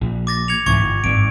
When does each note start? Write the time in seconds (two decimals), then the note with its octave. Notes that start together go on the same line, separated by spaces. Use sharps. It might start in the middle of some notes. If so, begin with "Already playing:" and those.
0.02 A#1
0.27 D6 A6 A#6
0.48 G#6 C#7 F7
0.66 C2 G#2 E3 C#6 G#6
0.80 G1
1.04 G#1 G2 D7